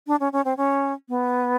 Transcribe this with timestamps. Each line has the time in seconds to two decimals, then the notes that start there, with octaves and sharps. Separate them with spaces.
0.07 D4
0.20 C#4
0.32 C#4
0.45 C4
0.57 C#4
1.09 B3